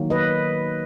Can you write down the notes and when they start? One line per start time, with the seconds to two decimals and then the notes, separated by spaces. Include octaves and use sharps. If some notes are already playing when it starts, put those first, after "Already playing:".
Already playing: D#3 F#3 A#3
0.10 B4 D#5